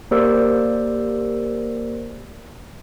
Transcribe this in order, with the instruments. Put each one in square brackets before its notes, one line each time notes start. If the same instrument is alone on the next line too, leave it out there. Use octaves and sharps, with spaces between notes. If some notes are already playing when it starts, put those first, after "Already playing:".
[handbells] A#3 G4 A#4 C5 D5 E6